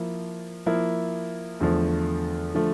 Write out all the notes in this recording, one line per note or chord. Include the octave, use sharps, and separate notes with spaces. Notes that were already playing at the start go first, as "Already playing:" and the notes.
Already playing: F3 A#3 E4
F3 A#3 E4
E2 D3 F3 A3
D3 F3 A3